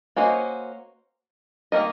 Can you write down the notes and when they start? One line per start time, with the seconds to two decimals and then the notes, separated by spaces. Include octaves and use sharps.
0.16 A#3 C#4 F#4 C5 D#5
1.72 D#3 A#3 D#4 A#4 D#5